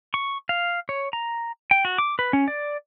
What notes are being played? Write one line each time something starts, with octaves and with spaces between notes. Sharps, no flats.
C#6
F5
C#5
A#5
G5
F#4
D6
B4
C#4
D5